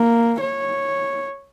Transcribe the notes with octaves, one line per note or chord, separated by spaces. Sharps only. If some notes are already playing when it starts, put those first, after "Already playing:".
Already playing: A#3
C#5